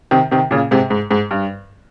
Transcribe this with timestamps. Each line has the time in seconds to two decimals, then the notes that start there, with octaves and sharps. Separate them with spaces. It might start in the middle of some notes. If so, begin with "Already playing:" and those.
0.11 C3 D#3
0.31 C3 D#3
0.51 A#2 C#3
0.71 G#2 C3
0.90 G#2
1.11 G#2
1.31 G2